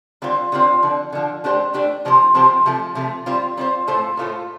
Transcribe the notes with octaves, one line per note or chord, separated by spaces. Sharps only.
D3 G3 C4 F4 C5
D3 G3 C4 F4 C5
D3 F3 D4
D3 F3 D4
A3 D4 G4 C5
A3 D4 G4 C5
C3 F3 C4 G4 C5
C3 F3 C4 G4 C5
C3 F3 A3
C3 F3 A3
G3 C4 F4 C5
G3 C4 F4 C5
A2 A3 F4 A4 C5
A2 A3 F4 A4 C5